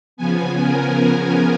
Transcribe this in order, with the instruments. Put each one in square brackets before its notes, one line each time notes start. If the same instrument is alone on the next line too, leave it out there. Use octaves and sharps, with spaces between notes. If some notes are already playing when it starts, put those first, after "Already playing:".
[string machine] C#3 F3 B3 G#5
A#4